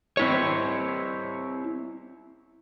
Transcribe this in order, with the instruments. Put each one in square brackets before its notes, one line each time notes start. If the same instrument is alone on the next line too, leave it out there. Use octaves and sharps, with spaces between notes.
[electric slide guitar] C4 E4 C#5